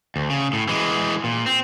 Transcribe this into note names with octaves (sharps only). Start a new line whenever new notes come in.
D2
C#3
A2
E3 G#3
A#2
C4